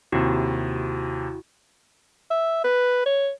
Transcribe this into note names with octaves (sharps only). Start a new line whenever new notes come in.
D#2 C3 E4 F#4
E5
B4
C#5